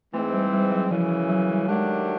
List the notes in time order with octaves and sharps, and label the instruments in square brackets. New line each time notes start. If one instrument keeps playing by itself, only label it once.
[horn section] G#2 E3 G#3 C4 [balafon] A3
[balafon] G3
G3
F#3
[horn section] F#2 C#3 E3 [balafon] F3
[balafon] F3
F#3
G3
[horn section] D#3 F#3 A3 D4 G4 [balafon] G#3